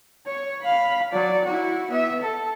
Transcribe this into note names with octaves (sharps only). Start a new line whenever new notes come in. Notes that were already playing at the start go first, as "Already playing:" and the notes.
C#5
F5 B5
F#3 D5
E4 F#4
B3 E5
A4